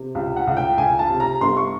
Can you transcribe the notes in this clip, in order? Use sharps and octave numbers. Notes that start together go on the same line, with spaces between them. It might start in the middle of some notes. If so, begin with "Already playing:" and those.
Already playing: C3
C#2
F#5
C#2
G5
C#2 G#5
A5
C3
A#5
G1 C6
C#6